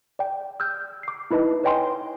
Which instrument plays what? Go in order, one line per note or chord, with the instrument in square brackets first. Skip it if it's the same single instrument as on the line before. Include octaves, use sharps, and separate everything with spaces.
[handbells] D5 G5
E6 F6 G6
D6 C7
D#4 E4 B4 D#5 A5
B4 C#5 D#5 G5 G#5 C6